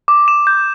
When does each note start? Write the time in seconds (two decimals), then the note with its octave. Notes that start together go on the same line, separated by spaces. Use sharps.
0.08 D6
0.28 E7
0.47 G6